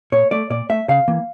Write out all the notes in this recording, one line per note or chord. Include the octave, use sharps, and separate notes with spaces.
A#2 C#5
A3 D5
A#2 D5
A3 E5
C#3 F5
E3 A#3